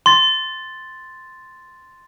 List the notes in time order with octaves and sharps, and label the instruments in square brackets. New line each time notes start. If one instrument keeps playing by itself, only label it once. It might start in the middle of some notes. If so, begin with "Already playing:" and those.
[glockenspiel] C6 A6